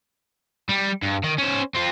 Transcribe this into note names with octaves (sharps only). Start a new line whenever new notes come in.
G3
G2
D#3
C#4 C5
C4 F4